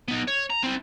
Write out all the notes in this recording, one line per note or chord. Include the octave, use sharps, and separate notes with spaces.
B3 D#4
C#5
A#5
C4 E4